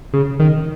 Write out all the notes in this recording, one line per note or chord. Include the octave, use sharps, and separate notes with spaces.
C#3
D#3